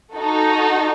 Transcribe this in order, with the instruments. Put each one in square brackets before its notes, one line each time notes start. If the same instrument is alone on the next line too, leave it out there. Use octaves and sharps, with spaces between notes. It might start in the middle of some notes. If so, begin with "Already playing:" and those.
[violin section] D#4 F#4 A4